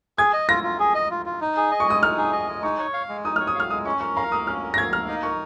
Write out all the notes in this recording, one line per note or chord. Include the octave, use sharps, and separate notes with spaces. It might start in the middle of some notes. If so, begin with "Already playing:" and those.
G#4 G#6
D#5
F4 A#6
F4
G#4
D#5
F4
F4
D#4
G#4
D#5
C#6
G#3 D#6
D#4 F6
G#4
D#5
G#3
D#4 C#6
C#5
F5
G#3
D#4 D#6
C#5 F6
D#6
F5 F6
G#3 D#6
C#4 C#6
A#4 C#6
F5 A#5
A#3 D#6
C#4 F6
A#4
A#6
F5 G#6
A#3 F6
D#4
A#4 C#6